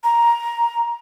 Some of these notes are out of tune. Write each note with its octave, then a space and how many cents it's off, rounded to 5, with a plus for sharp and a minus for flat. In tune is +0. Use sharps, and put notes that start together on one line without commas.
A#5 +10